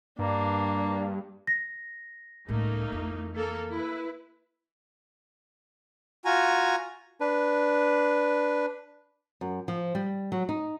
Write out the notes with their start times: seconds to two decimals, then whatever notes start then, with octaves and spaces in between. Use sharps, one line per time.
0.19 G2 A#3 D4
1.47 A#6
2.48 C#2 A2 A3 A#3 D#4
2.92 F2 E3
3.33 A#3 A4
3.71 E4 B4
6.25 F4 F#4 G#5 A#5
7.20 D4 B4
9.41 F#2
9.68 F3
9.95 G3
10.32 F#3
10.49 D#4